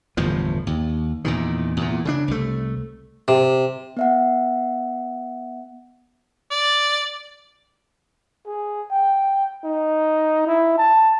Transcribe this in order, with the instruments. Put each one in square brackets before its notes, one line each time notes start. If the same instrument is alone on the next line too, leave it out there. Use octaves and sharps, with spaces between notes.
[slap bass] G1 E2 A2 F3
D#2
E2 A#2 D#3
E2 A#2
C#3 E3 D4
C2 A3
[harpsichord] C3
[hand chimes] B3 E5 F#5
[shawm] D5
[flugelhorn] G#4
G5
D#4
E4
A5